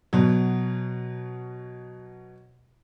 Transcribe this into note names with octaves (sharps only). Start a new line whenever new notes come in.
B2 F#3